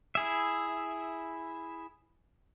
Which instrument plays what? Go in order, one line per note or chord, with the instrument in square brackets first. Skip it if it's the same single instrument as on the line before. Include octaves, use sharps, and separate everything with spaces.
[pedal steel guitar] E4 G#4 E5